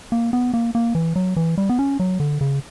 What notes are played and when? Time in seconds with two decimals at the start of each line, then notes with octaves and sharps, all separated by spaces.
0.12 A#3
0.33 B3
0.54 A#3
0.75 A#3
0.95 E3
1.16 F#3
1.36 E3
1.58 G3
1.69 B3
1.79 C#4
2.00 F#3
2.20 D3
2.41 C#3